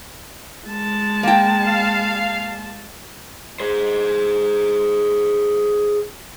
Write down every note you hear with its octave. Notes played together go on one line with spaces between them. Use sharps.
G#3 A5
A#3 G5
F5
G#4 C5